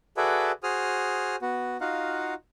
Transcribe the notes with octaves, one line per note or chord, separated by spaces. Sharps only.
F#4 G#4 A4 B4 D5 E5
F#4 G#4 C5 D#6 F6
B3 F#4
D#4 F4 F#4 F5 F#5